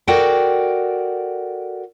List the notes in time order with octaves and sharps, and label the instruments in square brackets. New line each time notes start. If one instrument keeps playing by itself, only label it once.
[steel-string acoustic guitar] F#4 A4 A#4 D5 F#5 G5